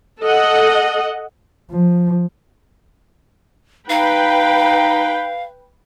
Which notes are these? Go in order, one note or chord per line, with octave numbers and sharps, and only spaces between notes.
A4 D#5 F#5
F3
D#4 B4 F5 G5 B5